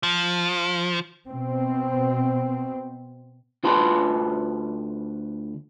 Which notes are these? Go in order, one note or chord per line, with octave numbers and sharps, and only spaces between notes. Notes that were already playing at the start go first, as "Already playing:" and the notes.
F3
B2 C4
D2 F4 B4 A5 B5 C6